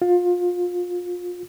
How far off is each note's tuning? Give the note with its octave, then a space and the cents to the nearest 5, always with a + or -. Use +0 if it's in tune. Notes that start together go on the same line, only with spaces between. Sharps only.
F4 +25